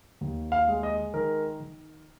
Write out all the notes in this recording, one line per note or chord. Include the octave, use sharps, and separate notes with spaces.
D#2
F5
G#3
D#5
D#3 A#4
D#3